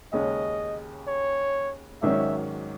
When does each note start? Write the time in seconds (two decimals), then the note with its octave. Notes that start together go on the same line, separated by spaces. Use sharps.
0.12 D#2 C#3 G#3 C#4 D#5
1.07 C#5
2.02 G#1 G#2 D#3 F#3 C#4 E5